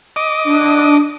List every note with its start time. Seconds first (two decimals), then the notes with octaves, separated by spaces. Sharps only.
0.16 D#5 D6
0.45 D4